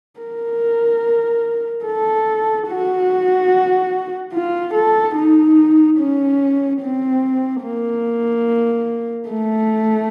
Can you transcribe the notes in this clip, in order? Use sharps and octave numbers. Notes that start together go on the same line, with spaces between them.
A#4
A4
F#4
F4
A4
D#4
C#4
C4
A#3
A3